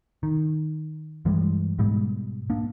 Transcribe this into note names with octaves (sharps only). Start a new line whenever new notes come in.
D#3
G2 E3 G3 G#3
G#2 B2 G3 G#3
A#3 D4